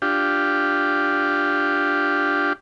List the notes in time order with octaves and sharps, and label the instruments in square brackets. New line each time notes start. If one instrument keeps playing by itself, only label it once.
[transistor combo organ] D4 F4 G4